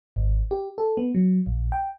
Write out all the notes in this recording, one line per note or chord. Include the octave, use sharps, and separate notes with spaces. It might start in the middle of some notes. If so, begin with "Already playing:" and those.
G#1
G4
A4
B3
F#3
A#1
G5